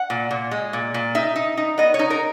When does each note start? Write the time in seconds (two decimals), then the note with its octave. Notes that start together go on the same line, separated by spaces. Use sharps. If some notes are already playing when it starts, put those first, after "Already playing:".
Already playing: F#5
0.10 A#2
0.31 A#2
0.51 G#3
0.73 A#2
0.94 A#2
1.15 D#4 E5
1.36 D#4
1.57 D#4
1.78 B3 D#5
1.94 C#5
1.99 D#4
2.10 A#4